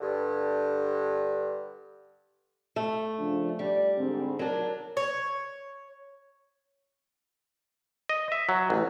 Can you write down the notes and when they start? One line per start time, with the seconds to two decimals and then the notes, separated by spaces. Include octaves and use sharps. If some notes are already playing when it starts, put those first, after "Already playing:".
0.01 G2 D3
2.76 A3
3.19 C#3 F3 D4
3.59 G3 D5
3.97 G#2 D3 C4
4.39 F#3 D4 A#4
4.97 C#5
8.09 D#5
8.32 E5
8.49 F#3
8.70 A1